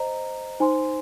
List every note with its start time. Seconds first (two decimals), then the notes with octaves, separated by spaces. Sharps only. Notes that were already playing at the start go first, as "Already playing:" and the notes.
Already playing: C5 D#5 A#5
0.60 D#4 C5 G#5 C6